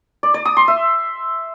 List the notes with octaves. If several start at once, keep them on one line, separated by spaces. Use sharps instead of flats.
D5
D5
D#6
C6
E5